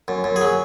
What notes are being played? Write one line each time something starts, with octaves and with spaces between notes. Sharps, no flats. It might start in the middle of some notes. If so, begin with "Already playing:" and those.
F#2
F#2
G#4
F#3